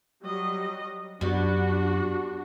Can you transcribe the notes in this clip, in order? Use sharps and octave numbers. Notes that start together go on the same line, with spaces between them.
F#3 G3 D#5
F#2 G3 B3 D4 F#4